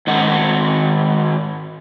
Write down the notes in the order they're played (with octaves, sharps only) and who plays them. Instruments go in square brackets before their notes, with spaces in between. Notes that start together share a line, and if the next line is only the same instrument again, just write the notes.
[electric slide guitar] G#2 D#3 F#5